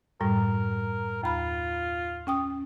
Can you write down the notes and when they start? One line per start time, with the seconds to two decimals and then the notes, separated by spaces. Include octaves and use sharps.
0.21 F#2 A2 G3 A#4
1.24 D#2 F4 B5
2.27 C#4 G5 D#6